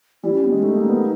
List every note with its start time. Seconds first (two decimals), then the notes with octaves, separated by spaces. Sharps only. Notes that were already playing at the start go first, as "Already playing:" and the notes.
0.23 G3 E4
0.33 C#4
0.44 B3
0.52 G#3 C#4
0.63 A3 D#4
0.76 A#3
0.89 B3